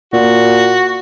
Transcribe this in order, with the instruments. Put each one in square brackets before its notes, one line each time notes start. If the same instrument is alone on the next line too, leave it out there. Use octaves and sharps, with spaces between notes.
[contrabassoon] A#2 [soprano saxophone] F#4